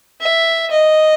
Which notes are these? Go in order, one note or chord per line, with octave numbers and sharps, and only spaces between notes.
E5
D#5